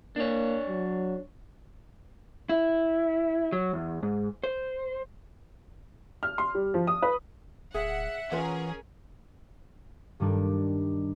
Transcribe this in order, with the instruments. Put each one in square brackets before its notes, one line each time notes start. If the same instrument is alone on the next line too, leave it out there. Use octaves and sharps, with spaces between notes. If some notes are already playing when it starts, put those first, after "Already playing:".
[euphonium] A#3 [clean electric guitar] D4 C#5
[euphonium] F#3
[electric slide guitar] E4
F#3
E2
G#2
C5
[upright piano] F6
C6
G3
F3
D#6
B4
[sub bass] D1 [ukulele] G#4 [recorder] E5 [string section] F#5
[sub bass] E3 [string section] C#4 G#4 A#4 [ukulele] F4 B4 F#5
[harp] G2 D#3 G3 D4 D#4